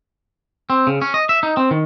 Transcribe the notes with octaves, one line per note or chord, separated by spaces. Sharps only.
C4
C#3
C#4
D#5
E5
D#4
C4
D#3